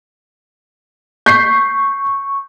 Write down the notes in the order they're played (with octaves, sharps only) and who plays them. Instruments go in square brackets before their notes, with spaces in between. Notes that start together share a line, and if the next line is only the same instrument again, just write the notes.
[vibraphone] C#6 [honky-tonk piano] G6 B6 C7